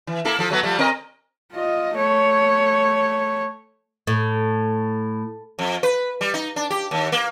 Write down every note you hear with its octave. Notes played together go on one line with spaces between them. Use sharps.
E3
A#3 E4 A4
F3 A4
F#3 A3 B3
F3 G3 A3
C4 A#4 D#5
F4 D#5
A3 C#5
A2
F2
B4
G3
D#4
D4
G4
D#2
A#3